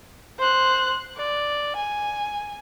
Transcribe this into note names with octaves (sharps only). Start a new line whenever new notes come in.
C5 F#6
D5
G#5